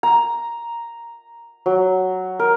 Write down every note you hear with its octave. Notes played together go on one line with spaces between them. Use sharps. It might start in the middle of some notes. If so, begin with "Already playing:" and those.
A#5
F#3
A#4